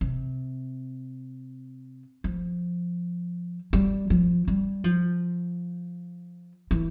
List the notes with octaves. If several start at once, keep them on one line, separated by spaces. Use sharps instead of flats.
C3
F3
G3
F3
G3
F3
E3